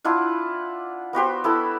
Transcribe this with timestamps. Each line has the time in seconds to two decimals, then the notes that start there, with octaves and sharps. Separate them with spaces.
0.04 D4 E4 F4 F#5
1.13 B3 F#4 G4 C5
1.44 B3 E4 A4 B5